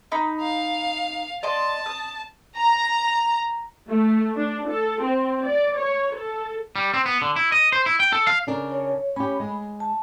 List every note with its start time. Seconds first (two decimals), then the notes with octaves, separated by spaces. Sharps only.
0.12 D#4 B5
0.40 F5
1.43 D5 D#5 A5 C6
1.86 D#6
2.56 A#5
3.89 A3
4.36 D4
4.68 A4
5.02 C4
5.47 D5
5.76 C#5
6.15 A4
6.76 G3
6.94 C4
7.06 B3
7.22 D3
7.36 E4
7.52 D#5
7.72 C5
7.86 E4
8.00 G5
8.13 A4
8.27 F5
8.47 C#3 D4 A#4
8.72 C#5
9.16 C#4 G4 B5
9.40 G#3
9.80 A5